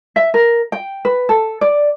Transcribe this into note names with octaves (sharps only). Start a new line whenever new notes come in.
E5
A#4
G5
B4
A4
D5